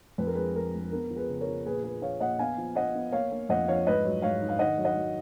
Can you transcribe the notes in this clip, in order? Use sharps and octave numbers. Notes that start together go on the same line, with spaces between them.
F2 B4
A#4
G#3 G#4 B4
G#3 A#4
G#3
B3 A#4
F3
G#4 B4
C#3
A#4 C#5
F3
A#2 G#4 B4
A#3 G#4 B4
F3 C#5 F5
A#2 D#5 F#5
B3 F5 G#5
F3
B3 D#5 F#5
B3
A#3 C#5 F5
A#3
F2 D#5 F#5
F3 C#5 F5
G#2 B4 D#5
F#3
G#2 C#5 F5
D#4
F5
D#3 D#5 F#5
F#3
D#5 F#5
F#3